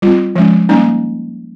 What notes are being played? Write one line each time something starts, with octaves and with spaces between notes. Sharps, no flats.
G3 C4 F4
F3 G#3 C#4
G3 A#3 C#4 D#4